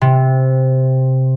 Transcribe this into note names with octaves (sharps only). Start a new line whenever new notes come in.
C3